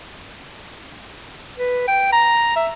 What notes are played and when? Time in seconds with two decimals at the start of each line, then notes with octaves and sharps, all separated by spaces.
1.58 B4
1.88 G5
2.12 A#5
2.56 E5